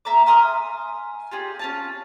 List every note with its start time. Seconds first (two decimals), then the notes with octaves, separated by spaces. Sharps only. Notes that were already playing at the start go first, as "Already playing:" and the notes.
0.05 A#3 E5 A#5 D6
0.26 G#5 C6 D#6 F6
1.31 F4 G4 G#4 D5
1.59 C#4 F4 A5